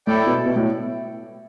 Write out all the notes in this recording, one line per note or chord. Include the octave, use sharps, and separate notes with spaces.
A2 E4 A4 D5 G5
B2
B2
A2